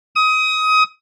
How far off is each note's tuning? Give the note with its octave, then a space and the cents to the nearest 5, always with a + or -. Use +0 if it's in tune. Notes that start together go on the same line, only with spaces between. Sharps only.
D#6 +25